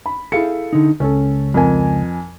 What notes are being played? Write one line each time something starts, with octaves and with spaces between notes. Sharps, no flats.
B5
E4 G#4 A4 F5 C#7
D3 D#4
C#2 C#4 A4
F2 A#4 G#5